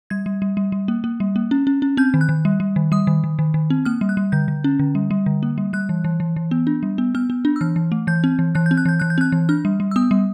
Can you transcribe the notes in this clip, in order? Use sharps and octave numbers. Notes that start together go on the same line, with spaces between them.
G3 G#6
G3
G3
G3
G3
A#3
A#3
G3
A#3
C#4
C#4
C#4
C4 G6
D#3
F#6
D#3
G3
G3
D#3
G3 D#6
D#3
D#3
D#3
D#3
C4
A#3 F6
G3
F#6
G3
D3 G6
D3
C#4
D3
G3
G3
D3
A#3
G3
G3 F#6
E3
E3
E3
E3
B3
D4
G3
B3
B3 F6
B3
D4
E6
E3 F6
E3
A3
E3 G6
C4
E3
E3 F#6
G6
C4
F#6
E3 G6
E3 F#6
G6
C4 F#6
E3
D4 F6
G3
G3
E6
B3 D#6
G3